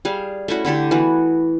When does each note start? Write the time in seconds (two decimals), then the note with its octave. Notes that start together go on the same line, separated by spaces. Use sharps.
0.05 G3 G#4 F5
0.48 A3 C#4 E4 F#4
0.65 D3 E4 G4 A4
0.91 E3 B3 F#4